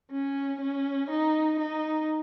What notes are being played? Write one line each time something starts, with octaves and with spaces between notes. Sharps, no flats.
C#4
C#4
D#4
D#4